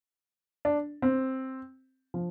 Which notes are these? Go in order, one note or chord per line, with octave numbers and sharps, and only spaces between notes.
D4
C4
F3